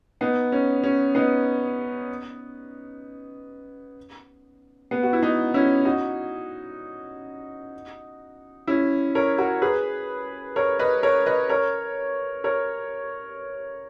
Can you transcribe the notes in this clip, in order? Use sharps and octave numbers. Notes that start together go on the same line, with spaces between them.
B3 D#4
C#4
C#4
B3 D#4
B3
F#4
E4
B3 D#4
C#4 E4
D#4 F#4
C#4 E4
A#4 C#5
F#4 A#4
G#4 B4
A#4 C#5
B4 D#5
A#4 C#5
B4 D#5
A#4 C#5
A#4 C#5